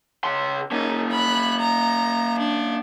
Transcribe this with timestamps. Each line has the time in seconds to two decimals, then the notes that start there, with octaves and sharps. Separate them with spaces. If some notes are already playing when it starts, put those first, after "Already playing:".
0.24 C#3 C6
0.72 A#3 C#4 D#4
1.11 B5 F#6
1.59 A#5
2.39 D4